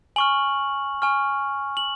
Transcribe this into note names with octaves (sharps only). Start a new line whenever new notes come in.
G#5 C#6 F6 F#7
G#5 C#6 F6
F#7